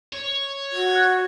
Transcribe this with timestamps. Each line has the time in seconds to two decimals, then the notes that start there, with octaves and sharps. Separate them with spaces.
0.13 C#5
0.72 F#4
0.91 F#6 G#6